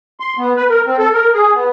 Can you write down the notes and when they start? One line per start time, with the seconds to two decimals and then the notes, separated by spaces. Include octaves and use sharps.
0.20 C6
0.38 B3
0.57 B4
0.69 A#4
0.87 C4
0.99 A4
1.13 A#4
1.34 G#4
1.54 B3